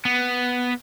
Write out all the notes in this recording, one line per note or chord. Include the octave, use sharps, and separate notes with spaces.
B3